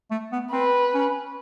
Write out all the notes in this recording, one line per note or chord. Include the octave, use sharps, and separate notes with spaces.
A3
B3
C4 B4
C#4